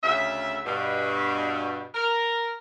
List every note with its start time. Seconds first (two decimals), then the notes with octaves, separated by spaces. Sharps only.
0.02 D2 C#3 E5
0.66 G2 B2
1.94 A#4